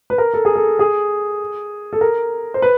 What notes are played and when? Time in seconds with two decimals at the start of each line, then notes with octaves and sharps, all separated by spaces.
0.10 B4
0.18 A#4
0.34 A4
0.45 G#4
0.56 A4
0.79 G#4
1.93 A4
2.01 A#4
2.54 C5
2.62 B4